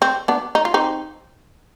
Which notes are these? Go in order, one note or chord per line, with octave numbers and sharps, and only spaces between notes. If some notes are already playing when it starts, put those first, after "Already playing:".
C4
B3 D4
D#4
F4
C4 D#4